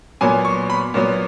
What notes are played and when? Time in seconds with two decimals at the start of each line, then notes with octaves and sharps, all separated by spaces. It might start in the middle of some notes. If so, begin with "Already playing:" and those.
0.21 A#2 F#3 B3 G#5
0.45 C#6
0.70 B5
0.94 A#2 F#3 B3